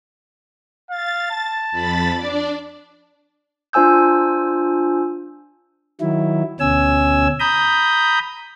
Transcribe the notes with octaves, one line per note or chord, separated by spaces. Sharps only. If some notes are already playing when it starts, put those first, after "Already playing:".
F5 A6
A5
F2 B5 A6
D4 D5
D4 F4 C5 G#5 E6 G6
D#3 F#3 E4
D2 B2 C#4 G#5 E6
A#5 B5 D#6 G6